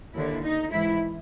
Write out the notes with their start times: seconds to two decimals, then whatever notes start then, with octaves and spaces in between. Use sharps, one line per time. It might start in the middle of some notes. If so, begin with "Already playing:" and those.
0.14 D#2 D3 E4
0.43 D#4
0.72 G#2 E3 E4